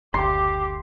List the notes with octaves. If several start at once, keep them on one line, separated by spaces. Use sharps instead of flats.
F#1 D2 G4 C6 D6